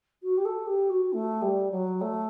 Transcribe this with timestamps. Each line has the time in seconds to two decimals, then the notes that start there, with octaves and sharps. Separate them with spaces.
0.23 F#4
0.37 G4
0.45 A4
0.67 G4
0.89 F#4
1.13 A3
1.42 G3
1.71 F#3
2.01 A3